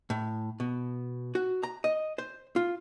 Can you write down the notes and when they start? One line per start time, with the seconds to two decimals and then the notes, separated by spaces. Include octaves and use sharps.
0.10 A2
0.60 B2
1.35 F#4
1.63 A#5
1.84 D#5
2.18 C5
2.56 F4